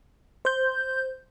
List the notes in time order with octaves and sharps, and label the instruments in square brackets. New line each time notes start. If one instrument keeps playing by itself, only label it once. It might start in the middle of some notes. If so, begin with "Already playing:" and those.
[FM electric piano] C5 G6